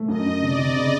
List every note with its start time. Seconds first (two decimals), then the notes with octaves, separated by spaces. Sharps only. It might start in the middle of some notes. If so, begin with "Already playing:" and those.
Already playing: A3
0.08 F#2 D#5
0.25 F#2
0.42 C3 D5
0.59 C3
0.76 C#3